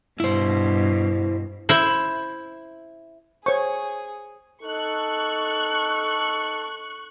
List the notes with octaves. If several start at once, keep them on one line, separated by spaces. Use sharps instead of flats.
G2 B2 E4 C5
E4 C5
G#4 C5 C#5 C#6
D#4 A4 C#6 F#6